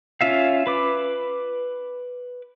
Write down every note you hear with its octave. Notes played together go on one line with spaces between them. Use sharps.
C#4 F4 E5 F5
B4 D6